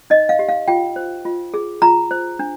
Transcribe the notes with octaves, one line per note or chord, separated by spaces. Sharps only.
D#4 D#5
F5
G4
F5
F4 G5
C5
F4
G#4
F4 A#5
C5
D4